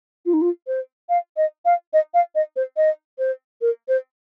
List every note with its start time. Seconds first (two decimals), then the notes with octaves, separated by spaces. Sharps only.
0.25 F4
0.33 D#4
0.41 F4
0.67 C5
1.09 F5
1.37 D#5
1.65 F5
1.93 D#5
2.14 F5
2.35 D#5
2.56 C5
2.76 D#5
3.18 C5
3.61 A#4
3.88 C5